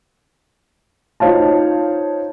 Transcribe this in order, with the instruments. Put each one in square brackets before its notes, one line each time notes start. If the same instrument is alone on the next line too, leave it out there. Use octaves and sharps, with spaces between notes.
[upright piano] D#4 F4 C5 C#5 F5 A5